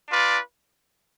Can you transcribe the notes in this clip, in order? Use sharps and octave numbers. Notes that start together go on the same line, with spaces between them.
D4 F4 B4 D5